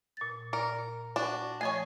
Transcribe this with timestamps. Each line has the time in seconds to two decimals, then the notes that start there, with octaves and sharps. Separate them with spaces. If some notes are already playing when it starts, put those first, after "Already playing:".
0.17 A#2 A6
0.53 A#2 A#4 D5 A#5
1.16 D4 F#4
1.61 F3 A3 C#5 D#5 G#5